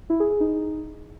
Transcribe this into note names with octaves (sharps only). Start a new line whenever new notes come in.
E4
G#4
G#4
D#4